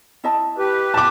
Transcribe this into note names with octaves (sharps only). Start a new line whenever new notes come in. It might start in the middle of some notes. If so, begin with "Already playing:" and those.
E4 D#5 A5
G4 B4
E4 A5 D6